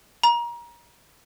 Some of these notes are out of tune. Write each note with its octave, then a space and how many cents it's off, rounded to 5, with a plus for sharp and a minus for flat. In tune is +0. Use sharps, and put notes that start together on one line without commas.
A#5 +30